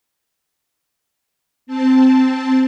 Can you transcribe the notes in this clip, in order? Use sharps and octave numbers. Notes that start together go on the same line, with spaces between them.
C4 A5